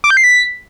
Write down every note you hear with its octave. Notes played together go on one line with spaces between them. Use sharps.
D6
G6
C7
B6